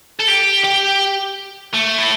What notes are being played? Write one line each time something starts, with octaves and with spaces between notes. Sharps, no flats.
A4
G4
G4
A3
E4